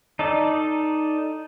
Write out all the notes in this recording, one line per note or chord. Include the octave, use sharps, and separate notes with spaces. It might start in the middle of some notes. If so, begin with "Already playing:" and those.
D#4 A4 D5